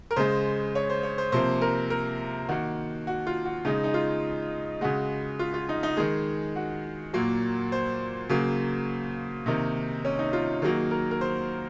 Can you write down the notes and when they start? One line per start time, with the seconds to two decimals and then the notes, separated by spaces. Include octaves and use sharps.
0.11 A#4
0.16 C#3 G#3 C5
0.75 C#5
0.90 C5
1.03 C#5
1.18 C5
1.32 C3 F3 A#3 C5
1.62 A#4
1.90 A#4
2.49 D#3 A#3 F#4
3.07 F#4
3.27 F4
3.45 F#4
3.65 C#3 G#3 D#4
3.84 D#4
3.94 F4
4.81 C#3 G#3 F#4
5.39 F4
5.54 F4
5.69 D#4
5.83 D#4
5.97 D#3 G#3 G#4
6.56 F#4
7.13 A#2 F#3 A#3
7.72 C5
8.29 C#3 F#3 A#3
9.46 C3 D#3 A#3 D#4
10.05 C#4
10.19 D#4
10.33 F4
10.62 D#3 F#3 A#3 G#4
10.91 A#4
11.11 A#4
11.21 C5